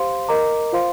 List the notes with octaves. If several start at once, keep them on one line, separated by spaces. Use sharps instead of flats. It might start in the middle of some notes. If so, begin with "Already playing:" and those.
Already playing: G4 C5 F5 C6
A#4 D#5 A#5 D6
F4 C5 F5 C6